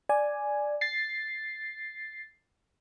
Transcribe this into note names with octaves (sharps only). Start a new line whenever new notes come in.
D5 G#5
A6 C7